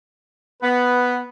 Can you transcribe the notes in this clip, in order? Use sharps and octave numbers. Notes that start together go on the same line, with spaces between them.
B3 B4